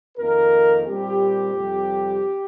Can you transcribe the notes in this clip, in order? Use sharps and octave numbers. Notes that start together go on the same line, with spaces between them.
F2 D#3 A#3 A#4
A#2 G3 C4 G4
F2 C3 G3